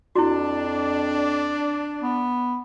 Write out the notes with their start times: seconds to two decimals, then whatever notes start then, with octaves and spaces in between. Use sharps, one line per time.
0.16 F2 D4 E4 F#4
2.01 B3